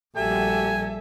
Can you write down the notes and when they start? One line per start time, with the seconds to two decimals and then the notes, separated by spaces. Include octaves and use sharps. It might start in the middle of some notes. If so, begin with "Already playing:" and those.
0.16 A#1 G3 A3 F#4 G4 A4 E5 G#5